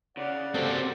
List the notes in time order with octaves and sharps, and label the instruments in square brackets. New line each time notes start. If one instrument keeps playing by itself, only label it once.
[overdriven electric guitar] C#3 [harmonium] D5 F#5
[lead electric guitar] A#3 F#4 [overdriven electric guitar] C4 [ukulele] G4 A4